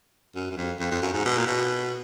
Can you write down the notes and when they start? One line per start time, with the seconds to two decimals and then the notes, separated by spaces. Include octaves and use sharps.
0.35 F#2
0.51 F#2
0.57 F2
0.80 F2
0.91 F2
1.02 F#2
1.13 G#2
1.25 B2
1.38 A#2
1.47 B2